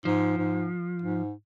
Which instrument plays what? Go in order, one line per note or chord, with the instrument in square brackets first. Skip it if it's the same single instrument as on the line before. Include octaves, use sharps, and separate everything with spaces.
[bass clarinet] G#2 [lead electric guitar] F3
[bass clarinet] G#2
G#2